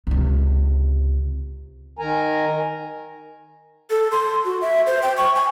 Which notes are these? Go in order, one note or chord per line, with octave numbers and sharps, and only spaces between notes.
C#2 C3
D#3 A#4 G#5 A#5
A4
C6
F#4
E5
C5
G5
C#6
G#5